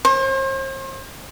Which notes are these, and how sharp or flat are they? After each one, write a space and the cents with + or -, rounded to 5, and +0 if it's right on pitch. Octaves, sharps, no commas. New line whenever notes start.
C5 +40